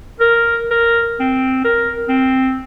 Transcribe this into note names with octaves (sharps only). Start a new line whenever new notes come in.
A#4
A#4
C4
A#4
C4